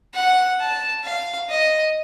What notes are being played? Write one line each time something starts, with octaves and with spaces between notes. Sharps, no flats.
F#5
A5
F5
D#5